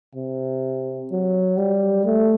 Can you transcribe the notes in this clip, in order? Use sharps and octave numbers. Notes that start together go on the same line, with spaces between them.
C3
F#3
G3
A3